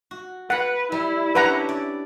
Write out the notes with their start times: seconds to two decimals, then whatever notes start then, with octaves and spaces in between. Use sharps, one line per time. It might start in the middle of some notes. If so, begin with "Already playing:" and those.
0.11 F#4
0.50 B4 F5 F#5 B5
0.92 G3 E4
1.35 C#4 D4 G4 B4 F#5 A#5
1.69 D5